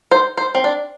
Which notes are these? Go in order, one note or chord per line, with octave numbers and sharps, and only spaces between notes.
C5
C5
C4
D4